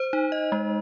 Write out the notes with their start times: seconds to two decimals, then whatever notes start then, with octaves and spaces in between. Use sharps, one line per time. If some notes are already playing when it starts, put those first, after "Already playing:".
Already playing: C5
0.13 D#4
0.32 D#5
0.52 G#3